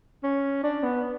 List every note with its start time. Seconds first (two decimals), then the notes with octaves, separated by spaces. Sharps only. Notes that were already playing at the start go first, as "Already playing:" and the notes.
0.23 C#4
0.63 D4
0.83 B3